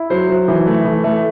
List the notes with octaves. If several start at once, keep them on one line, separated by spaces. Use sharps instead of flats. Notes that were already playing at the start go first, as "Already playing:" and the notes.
Already playing: E4
F#3 C5
F#3
E3
A3
E3
A3